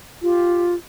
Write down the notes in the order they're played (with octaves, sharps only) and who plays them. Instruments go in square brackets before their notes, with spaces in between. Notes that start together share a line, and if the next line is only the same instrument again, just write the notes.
[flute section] F4 G4